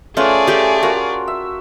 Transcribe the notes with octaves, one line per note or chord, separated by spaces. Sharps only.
A3 C#4 F4 G#4 B4 D5 C#6
A3 G4
F4 F#4 A#4 G5
E5